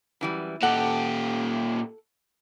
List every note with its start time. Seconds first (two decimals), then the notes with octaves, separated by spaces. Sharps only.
0.21 F#2 E3 G3
0.63 A#2 G4 A4 F#5